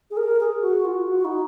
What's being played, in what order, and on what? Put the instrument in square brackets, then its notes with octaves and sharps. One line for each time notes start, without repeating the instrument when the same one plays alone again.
[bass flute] G#4
A#4
G#4
F#4
F4
F#4
D#4